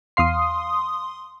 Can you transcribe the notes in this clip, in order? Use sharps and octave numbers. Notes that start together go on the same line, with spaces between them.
E2 F5 C6 D#6 C7